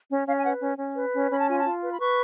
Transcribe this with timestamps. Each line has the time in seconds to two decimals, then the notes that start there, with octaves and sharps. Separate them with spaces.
0.09 C#4
0.26 C#4 F5
0.39 G#5
0.44 B4 F#5
0.62 C#4
0.78 C#4
0.96 B4
1.13 C#4
1.30 C#4 B5
1.40 A5
1.48 F4 G#5
1.59 A5
1.65 F4
1.83 B4
1.93 B5
2.00 B4 C#6